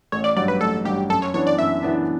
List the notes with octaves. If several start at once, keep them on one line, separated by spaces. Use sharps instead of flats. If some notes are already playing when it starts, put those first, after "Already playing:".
A1 C#5
D5
G2 F#3 D5
B4
A1 A4
G2 F#3 G4
F#2 A4
C#5
E3 B3 D4 C#5
D5
F#2 E5
E3 B3 D4